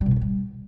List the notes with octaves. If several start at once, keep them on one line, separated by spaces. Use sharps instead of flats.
G3
B2
G#2
A#2
G3